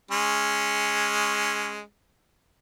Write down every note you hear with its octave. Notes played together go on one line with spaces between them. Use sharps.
G#3 C#4